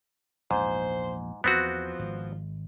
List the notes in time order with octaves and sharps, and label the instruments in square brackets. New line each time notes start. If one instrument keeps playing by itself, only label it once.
[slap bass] A#1 E2 [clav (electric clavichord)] G#2 [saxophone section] C5
[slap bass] E2 [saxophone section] F3 [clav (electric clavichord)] B3 C4 F#4
[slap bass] G#1